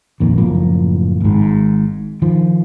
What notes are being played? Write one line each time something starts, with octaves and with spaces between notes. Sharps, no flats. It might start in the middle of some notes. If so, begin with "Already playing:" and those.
A#1 F2 D#3 A#3
F#1 A2 F3 A#3
G#1 G#2
D#3 F3